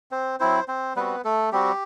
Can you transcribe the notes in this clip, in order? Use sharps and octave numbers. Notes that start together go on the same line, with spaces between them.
C4 C5
F#3 C4 E4 C5
C4 C5
G3 B3 C4 F#4 B4
A3 A4
G3 C4 F#4 G4